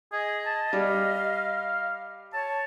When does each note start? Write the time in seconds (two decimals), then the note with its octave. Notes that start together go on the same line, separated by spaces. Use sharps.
0.12 G#4 D#5
0.46 A5
0.73 G3 F5
2.34 C#5 A5